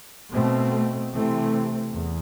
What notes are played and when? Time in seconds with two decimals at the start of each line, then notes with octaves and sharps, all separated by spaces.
0.33 B2 A3 C4
1.12 C3 E3 A3 C4
1.92 E2